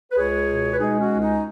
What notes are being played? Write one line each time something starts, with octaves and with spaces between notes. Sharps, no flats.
B4
C#2 G#4 C#5
B2
B4
G#3 D#4 G#4
C#4 F#4
C#2
D#4